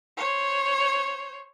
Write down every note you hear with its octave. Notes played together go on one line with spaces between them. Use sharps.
C5 C#5